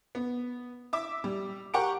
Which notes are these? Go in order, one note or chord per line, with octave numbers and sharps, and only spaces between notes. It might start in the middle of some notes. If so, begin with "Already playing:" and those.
B3
E5 D6 E6
G3
G4 A#4 F#5 C#6 D6 D7